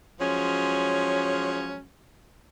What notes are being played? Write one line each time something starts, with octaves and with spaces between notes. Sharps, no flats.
F3 F#3 G#3 C#4